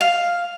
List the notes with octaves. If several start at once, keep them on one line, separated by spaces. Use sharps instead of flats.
F5